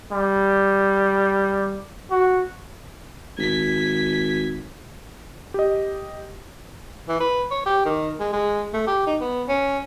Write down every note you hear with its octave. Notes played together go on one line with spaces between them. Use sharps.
G3
F#4
G#1 G#6 B6
G4 D#5
E3
B4
C#5
G4
D#3
G#3
G#3
A3
G4
D#4
B3
C#4